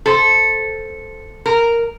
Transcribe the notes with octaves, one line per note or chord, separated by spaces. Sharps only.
A4 C5
A#4